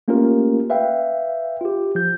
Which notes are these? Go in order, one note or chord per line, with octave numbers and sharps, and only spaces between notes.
A3 A#3 C#4 F4 G4 A#4
B4 E5 F5 G5
F4 G4
F3 G6